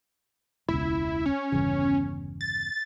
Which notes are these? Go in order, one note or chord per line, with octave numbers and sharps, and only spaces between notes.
E1 C#2 E4
C#4
G1 E2 C#3
A6